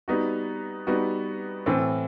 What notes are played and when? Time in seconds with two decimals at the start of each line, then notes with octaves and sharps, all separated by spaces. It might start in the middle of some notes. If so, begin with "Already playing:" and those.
0.08 G3 B3 D#4 F#4
0.87 G3 B3 D#4 F#4
1.66 A2 E3 A3 C4